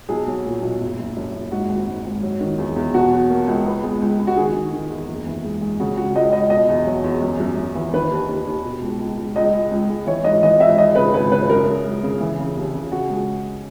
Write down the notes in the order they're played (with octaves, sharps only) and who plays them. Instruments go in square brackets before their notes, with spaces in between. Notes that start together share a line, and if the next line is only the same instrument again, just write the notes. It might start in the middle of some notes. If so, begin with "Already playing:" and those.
[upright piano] B1 G#4
F#3
A#2
B1
F#1
F#1
F#2
F#1
G#2 F#4
G#1
G#2
G#1
F#3
D#3
E2
E2
B2 F#4
F#3
A#3
C#2
B3
G#3
C#2
C#2
F#4
D#3 G#4
D#3
D#3
E2
F#1
E3
G#3
G#3
C#3 F#4
C#2 F#4
C#2 D#5
C#2 D#5
B2 D#5
E2
F#3
E2
F#2
F#2
F#2
E3
D#3 B4
D#2
D#2
D#2
B2
C#2
C#2
C#2
C#2 D#5
G#3
C#2
G#3
E3 C#5
G#2 D#5
E3 D#5
G#1 E5
G#1 D#5
C#3 B4
G#1 B4
C#3 B4
F#2 A#4
F#2
G#3
C#3
E3
C#3
D#2
C#3
C#3 F#4
G#3